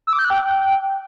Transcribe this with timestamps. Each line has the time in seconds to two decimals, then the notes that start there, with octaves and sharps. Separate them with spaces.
0.07 E6
0.13 D6
0.19 G6
0.24 F#6
0.30 G5